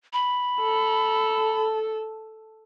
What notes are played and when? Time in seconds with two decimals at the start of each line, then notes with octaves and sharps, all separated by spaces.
0.13 B5
0.61 A4